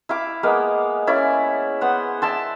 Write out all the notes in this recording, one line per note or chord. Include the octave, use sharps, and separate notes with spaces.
E4 F5 D6
G#3 A#3 B3 F5
C#4 E4 D5
B3 C5 F#5
D5 E5 A5 C6